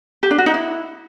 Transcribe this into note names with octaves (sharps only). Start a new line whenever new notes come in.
G4
D4
F#4
D#4
E4